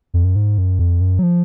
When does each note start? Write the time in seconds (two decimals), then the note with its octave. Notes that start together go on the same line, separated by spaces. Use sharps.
0.14 F2
0.24 F#2
0.36 G#2
0.58 F#2
0.79 F2
1.01 F#2
1.19 F#3
1.23 F3